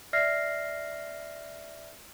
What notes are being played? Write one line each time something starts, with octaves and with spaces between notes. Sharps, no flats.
D5 E5 F6 A#6 C7